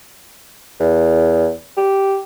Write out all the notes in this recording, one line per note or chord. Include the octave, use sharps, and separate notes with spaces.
E2
G4